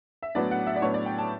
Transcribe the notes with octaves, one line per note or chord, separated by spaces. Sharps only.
E5
A2 F#3 B3 D4 D5
F#5
E5
D5
A2 F#3 B3 D4 C#5
D5
G5
A5